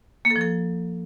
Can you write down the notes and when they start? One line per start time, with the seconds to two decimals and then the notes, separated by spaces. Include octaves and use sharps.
0.25 A#3
0.30 A4
0.36 F3
0.41 A4